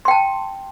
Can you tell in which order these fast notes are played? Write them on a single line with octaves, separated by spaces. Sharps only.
C6 G5 A5